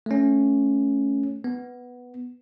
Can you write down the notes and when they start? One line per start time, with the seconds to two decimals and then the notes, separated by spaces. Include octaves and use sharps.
0.06 A3 C#4
1.44 B3